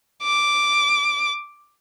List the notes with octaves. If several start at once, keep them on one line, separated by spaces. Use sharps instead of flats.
D6